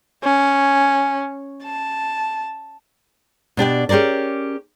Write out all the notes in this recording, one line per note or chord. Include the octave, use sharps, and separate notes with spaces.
C#4
A5
B2 D4 G4 D5
C#4 G4 G#4 A#4 D5